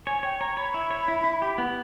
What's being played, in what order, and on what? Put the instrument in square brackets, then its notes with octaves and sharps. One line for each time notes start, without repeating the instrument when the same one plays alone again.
[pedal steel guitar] C#5 [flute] G#5
[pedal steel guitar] C#5 [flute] G5
[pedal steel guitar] C#5 [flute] A#5
[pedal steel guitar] C#5 [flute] B5
[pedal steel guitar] E4
C#5
E4
E4
G4
B3